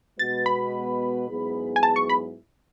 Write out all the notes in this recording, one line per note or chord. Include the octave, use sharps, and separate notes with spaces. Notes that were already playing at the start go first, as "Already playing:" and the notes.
B2 G#3 B3 F#4 B4 A6
B5
G#2 F#3 B3 E4 G#4
G#5
A5
C#6
B5